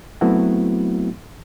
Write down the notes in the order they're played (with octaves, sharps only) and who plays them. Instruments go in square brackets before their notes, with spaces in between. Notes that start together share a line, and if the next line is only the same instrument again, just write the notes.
[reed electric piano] F#3 A3 B3 C4 E4 F#4